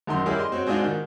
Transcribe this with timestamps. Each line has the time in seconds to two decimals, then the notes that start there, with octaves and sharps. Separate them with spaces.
0.07 G#1 F#2 D#3 A#5 C6
0.26 G3 E4 G4 G#4 A#4 C#5
0.38 D#5 C6
0.52 C4 F#4 C#5
0.67 G#3 C4 D4 D#4 F4 F#4
0.80 G#2 D#3